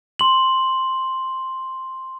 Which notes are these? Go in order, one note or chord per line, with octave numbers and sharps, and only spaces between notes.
C6 F#7